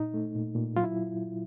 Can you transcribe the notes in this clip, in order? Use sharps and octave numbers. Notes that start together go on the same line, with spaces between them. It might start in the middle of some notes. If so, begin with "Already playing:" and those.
Already playing: A#2 D#4
A3
A#2
A#2
F#3 F4
E4